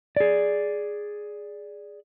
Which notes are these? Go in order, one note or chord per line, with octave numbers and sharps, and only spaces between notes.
G#4 D5